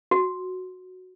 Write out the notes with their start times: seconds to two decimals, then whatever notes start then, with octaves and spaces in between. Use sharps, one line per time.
0.11 F#4